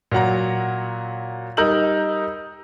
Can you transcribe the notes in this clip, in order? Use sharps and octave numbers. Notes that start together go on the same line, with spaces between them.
A#2 F#3 F#5 A#5
G3 D#4 A#4 E6 G6 F#7